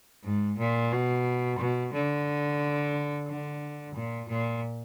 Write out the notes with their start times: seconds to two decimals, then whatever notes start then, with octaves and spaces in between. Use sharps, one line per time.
0.24 G#2
0.59 A#2
0.92 B2
1.59 B2
1.93 D3
3.27 D3
3.95 A#2
4.29 A#2